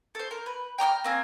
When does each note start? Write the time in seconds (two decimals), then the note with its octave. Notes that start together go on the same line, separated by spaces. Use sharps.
0.15 A4 C5
0.31 A#4
0.46 B4
0.78 G5 A#5 D#6 F6
1.04 A#3 C4 G#5